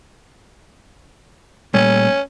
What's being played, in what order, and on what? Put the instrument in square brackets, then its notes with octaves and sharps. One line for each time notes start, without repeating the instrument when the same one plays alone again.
[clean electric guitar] A#2 G3 A3 [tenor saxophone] C#4